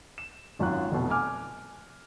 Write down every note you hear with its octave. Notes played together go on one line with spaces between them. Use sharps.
E7
G#1 F#2 F4 F#6
F1 B2
G#5 D6 F6